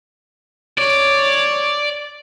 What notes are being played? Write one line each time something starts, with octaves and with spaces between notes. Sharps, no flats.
C#5 D5